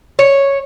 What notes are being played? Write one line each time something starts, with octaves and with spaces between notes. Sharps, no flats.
C#5